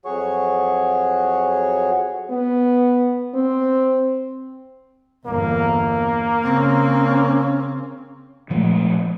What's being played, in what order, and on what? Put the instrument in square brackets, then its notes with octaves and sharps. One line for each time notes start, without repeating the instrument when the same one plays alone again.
[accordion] F2 F#3 F#4 G#4 C#5 C#6
[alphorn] B3
C4
[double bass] G1 E2 [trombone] A#3
[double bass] C#3 C4 [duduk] C#4
[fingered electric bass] A#2 F3 G#3 A3